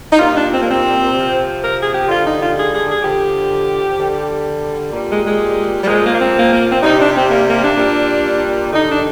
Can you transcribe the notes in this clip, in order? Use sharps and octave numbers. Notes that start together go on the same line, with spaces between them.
D#4
A#2 G3 F4
D4
C4
A#3
C4
C3 F3
A#4
G#4
G4
D3 G3 F4
D#4
F4
G#4
G#4
G#4
D3 F3 G4
D3 G3
A#2 G3
G#3
G#3
G3
A#2 F3 G#3
A#3
A#3
C4
A#3
A#3
C4
C3 G3 D#4
D4
C4
A#3
A#3
D4
A#2 G3
D3 G3 D#4
D4